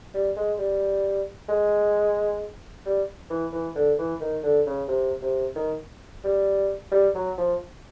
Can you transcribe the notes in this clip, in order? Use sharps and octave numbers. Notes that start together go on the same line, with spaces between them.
G3
G#3
G3
G#3
G3
E3
E3
D3
E3
D#3
D3
C#3
C3
C3
D#3
G3
G3
F#3
F3